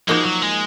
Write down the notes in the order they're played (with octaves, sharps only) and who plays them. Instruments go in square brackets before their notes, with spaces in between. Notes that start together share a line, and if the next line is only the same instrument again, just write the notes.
[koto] F3 A#3 D#4 F#4 [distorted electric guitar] G#3
[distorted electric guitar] F#3
G#3